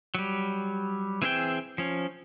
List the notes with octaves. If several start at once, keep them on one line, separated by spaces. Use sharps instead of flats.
F#3 G3
E3 C4 G#4 E5 G5
F3 C#4